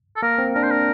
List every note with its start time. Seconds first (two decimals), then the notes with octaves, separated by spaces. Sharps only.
0.16 A4
0.22 A#3 A#4
0.38 C4
0.55 D4 A#4
0.63 C5
0.71 A#4